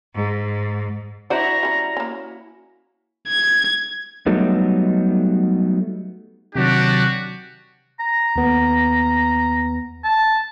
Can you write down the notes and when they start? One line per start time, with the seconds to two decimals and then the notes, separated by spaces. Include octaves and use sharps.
0.14 G#2
1.30 D4 E4 F#4 C5 D5 A#5
1.63 G3 C#4
1.97 A#3 C#4
3.28 G#6
4.26 F#3 G3 A3 B3 D#4
6.55 C3 D#3 F#3 D4 F#4 G4
8.00 A#5
8.36 D#2 B3
10.04 A5